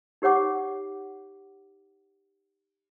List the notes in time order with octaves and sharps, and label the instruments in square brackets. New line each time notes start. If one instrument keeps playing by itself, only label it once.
[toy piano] D#4 G4 C#5 F#5 D6